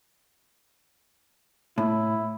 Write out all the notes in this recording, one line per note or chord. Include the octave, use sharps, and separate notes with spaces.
A2 E4